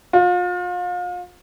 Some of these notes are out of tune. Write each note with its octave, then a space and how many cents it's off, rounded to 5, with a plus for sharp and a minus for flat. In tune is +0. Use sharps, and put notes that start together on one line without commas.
F4 +35